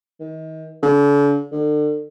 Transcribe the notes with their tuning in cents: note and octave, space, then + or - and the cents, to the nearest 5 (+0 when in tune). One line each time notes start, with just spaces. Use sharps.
D#3 +35
D3 -40
D3 +35